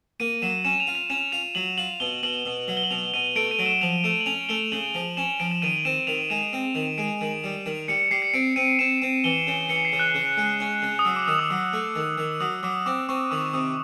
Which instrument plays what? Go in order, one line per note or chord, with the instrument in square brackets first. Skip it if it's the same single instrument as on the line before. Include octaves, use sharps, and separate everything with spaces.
[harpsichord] A#3 [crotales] D#7
[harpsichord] F#3 [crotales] E7
[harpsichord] C#4 [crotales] E7
[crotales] F7
[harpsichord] F4
[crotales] F7
[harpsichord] C#4 [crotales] E7
[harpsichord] F4 [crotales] F7
[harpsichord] F#3 [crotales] F#7
[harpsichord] F4 [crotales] F#7
[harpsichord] B2 [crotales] G7
[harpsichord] B2 [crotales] F#7
[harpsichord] B2
F#3
[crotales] G7
F#7
[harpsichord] B2 [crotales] F7
[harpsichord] B2 [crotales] D#7
[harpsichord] A3 [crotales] D7
[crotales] D#7
[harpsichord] F#3
[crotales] E7
[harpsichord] F3 [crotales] F7
[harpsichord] A3 [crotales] E7
[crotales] F#7
[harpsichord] C#4 [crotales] F7
[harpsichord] A3 [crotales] G7
[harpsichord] C#3 [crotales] F#7
[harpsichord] F3
[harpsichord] C#4 [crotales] E7
[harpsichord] F3 [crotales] D7
[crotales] E7
[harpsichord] D#3 [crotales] D#7
[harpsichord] C4 [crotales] E7
[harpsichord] D#3 [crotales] F7
[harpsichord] G#3 [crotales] E7
[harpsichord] C4
D#3
[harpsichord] G#3 [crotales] D7
[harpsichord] D#3
G3
D#3
[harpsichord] G3 [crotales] C#7
[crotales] C#7
[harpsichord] G3 [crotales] C7
[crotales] C#7
[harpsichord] C4 [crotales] D7
[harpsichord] C4 [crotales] D#7
[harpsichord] C4 [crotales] E7
[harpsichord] C4
[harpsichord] E3 [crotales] G7
[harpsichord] C#3
[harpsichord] E3 [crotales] C#7
[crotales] C7
[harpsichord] C#3
[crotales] F#6
[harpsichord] C#3
G#3
C#4
C#3
[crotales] D#6
[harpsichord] F#3 [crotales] E6
[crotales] D6
[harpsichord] D#3 [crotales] E6
[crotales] D#6
[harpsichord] F#3 [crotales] D6
[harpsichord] A3
D#3
D#3
[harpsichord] F#3 [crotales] D#6
[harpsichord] F#3 [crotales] D6
[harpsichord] C4 [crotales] D6
[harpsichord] C4 [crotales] C#6
[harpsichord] D#3 [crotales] D6
[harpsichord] C3 [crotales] D#6